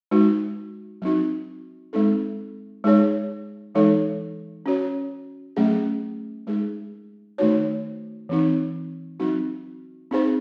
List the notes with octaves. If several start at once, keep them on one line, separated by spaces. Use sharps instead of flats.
G#3 D#4 F#4
F#3 C4 D#4 F#4
G#3 C4 D#4 A4
G#3 D#4 G#4 C#5
E3 G#3 D#4 A4 C#5
C#4 F#4 C#5
F#3 A3 C#4 G#4
G#3 D#4 G#4
D#3 A3 D#4 F#4 C#5
E3 C4 D#4
F#3 C4 D#4 F#4
C4 D#4 G#4 C5